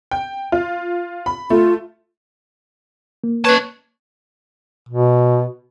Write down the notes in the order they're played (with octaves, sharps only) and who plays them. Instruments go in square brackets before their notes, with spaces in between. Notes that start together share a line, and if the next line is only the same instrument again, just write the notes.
[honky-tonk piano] G5
F4
B5
[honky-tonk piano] A3 [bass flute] F4
[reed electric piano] A#3
[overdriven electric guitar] C#4 A5 [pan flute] B4 [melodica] C#5
[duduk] B2